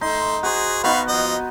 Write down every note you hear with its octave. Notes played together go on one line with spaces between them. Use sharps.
A3 D#4 C6
F#4 G#4 C5
B3 D#4 F#4 F5 B5 C#6
F3 D#5